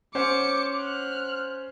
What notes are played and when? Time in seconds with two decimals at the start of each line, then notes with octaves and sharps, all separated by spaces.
0.15 C#4 C5 F#5 D6 C#7
0.76 F6 F#6